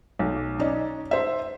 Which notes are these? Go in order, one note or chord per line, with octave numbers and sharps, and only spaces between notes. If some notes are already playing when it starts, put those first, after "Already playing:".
B1
C#4 D#4 D5
C5 E5